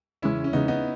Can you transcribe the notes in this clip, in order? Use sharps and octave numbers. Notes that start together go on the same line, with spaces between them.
E2 C#3 G#3 C#4 E4
C#4
E2 C#3 G#3 B3 D#4
B3 D#4